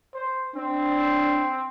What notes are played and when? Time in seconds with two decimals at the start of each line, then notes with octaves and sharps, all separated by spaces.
0.14 C5
0.56 C4 D4